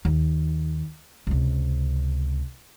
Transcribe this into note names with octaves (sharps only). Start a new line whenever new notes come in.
D#2
C#2 C3